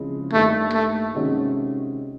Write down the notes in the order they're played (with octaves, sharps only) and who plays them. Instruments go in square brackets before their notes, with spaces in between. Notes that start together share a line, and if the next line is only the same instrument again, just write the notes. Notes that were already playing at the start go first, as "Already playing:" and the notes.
Already playing: [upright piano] C#3 F3 G#3 C4 E4
[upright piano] G2 D#3 G3 A#3 [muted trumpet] A3
[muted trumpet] A3
[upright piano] C3 D#3 G#3 C#4 F#4